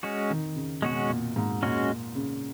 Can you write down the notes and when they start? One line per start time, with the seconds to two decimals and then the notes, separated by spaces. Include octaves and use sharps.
0.03 G#3 C#4 F#4
0.30 D#3
0.56 C#3
0.82 B2 G#3 C#4 F#4
1.10 A#2
1.36 G#2
1.63 A#2 G#3 C#4 F#4
2.15 C#3